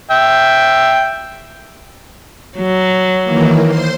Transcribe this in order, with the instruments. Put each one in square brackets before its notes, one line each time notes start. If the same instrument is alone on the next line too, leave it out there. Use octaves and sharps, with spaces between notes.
[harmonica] E5 G5
[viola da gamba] F#3
[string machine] D#3 E3 A#3
C5 C6